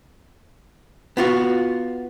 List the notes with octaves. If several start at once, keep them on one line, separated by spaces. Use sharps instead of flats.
B3 F4 F#4